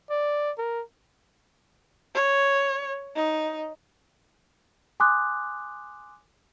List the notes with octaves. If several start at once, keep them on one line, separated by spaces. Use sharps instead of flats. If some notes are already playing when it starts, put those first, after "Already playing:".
D5
A#4
C#5
D#4
G#5 C6 D6 D#6 F#6